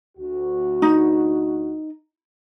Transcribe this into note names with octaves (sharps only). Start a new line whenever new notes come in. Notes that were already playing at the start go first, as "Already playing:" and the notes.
D2 F#4
D#4